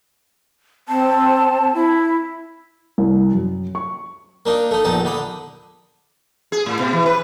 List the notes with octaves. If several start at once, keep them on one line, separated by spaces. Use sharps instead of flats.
C4 A5
E4
C2
F#2
C#6
A#3 D4 D#4
A3 D#4
A#1 E2 D#4 A5
D3 B5 D#6
G#4
A2
B2
E3
B4